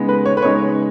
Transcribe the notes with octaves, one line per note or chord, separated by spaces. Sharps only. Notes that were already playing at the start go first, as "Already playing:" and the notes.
Already playing: C#3 G#3 B3 D#4
B4
C#5
B4
C#3 G#3 B3 D#4 C#5